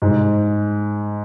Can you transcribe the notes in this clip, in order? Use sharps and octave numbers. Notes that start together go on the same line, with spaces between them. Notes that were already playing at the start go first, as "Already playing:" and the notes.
G#2